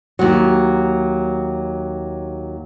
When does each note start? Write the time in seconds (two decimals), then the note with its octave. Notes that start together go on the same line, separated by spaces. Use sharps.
0.19 D#2 F#3